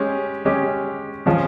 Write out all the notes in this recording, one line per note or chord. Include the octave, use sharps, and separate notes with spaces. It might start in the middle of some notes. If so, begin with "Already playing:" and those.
Already playing: G#3 C#4 G4
G#3 C#4 G4
F3 G#3 C#4